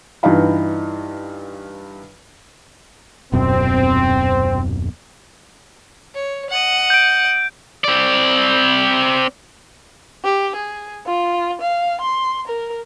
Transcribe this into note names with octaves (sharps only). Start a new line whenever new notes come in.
G2 E3 D#4 F4 F5 B5
D#1 F#2 B2 C4
C#5
D#5 F#5
G6 D7
C4 D5
G4
G#4
F4
F5
C6
A#4